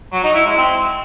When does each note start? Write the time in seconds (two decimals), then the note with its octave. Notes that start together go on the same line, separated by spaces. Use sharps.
0.12 F#3
0.24 D#4
0.35 E4
0.46 G#3
0.57 C4